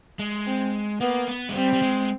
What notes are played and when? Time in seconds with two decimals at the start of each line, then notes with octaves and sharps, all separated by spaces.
0.19 G#3
0.47 C4
1.01 A#3 B3
1.28 B3
1.49 G#3
1.55 G3 C4
1.73 G3
1.82 G#3